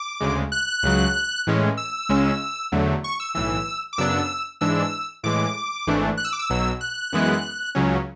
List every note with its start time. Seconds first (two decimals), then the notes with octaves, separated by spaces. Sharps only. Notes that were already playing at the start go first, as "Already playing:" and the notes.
Already playing: D6
0.20 D2 C#3 G#3
0.52 F#6
0.83 C#2 C#3 F#3
1.47 A2 E3 G#3 C#4
1.77 E6
2.09 C#2 C#3 G#3 C#4
2.72 E2 D3 F#3 A3
3.04 C#6
3.20 E6
3.35 B1 A2 E3 E6
3.93 D6
3.98 F#2 C#3 F#3 B3 D4 E6
4.61 G#2 E3 G#3 D4 E6
5.23 A2 E3 G#3 D6
5.87 G#1 G#2 E3 A3 D4
6.17 F#6
6.24 E6
6.33 D6
6.39 E6
6.50 B1 B2 F#3
6.81 F#6
7.13 F#2 E3 G#3 B3 E4
7.75 C#2 C#3 F#3 C#4